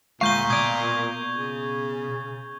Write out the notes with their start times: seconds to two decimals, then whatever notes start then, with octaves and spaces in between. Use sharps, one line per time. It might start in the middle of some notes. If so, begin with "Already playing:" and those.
0.21 D2 A#2 G#3 F5 C#6 G6 G7
0.50 B2 D5 D#6 G#6 G7
1.38 C#3